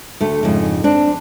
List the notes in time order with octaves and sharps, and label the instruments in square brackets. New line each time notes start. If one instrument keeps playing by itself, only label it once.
[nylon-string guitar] D2 A3
F2 G#2 C#3
C4 D4